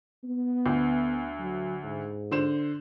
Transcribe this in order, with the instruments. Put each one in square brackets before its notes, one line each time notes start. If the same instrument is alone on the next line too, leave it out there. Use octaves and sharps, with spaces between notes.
[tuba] B3
[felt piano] D2
[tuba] F#3
G#2
[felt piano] D3 C5 E7